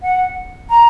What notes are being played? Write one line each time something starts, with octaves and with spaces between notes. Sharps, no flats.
F#5
A#5